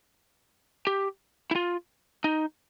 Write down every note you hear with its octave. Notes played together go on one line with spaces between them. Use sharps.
G4
E4
F4
D#4